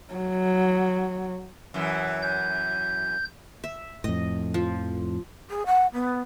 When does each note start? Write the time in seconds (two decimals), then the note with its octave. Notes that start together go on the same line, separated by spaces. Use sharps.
0.14 F#3
1.74 F#2 E3
2.22 G6
3.64 E5
4.04 F2 A2 D#5
4.54 F3
5.50 G#4
5.66 F#5
5.93 B3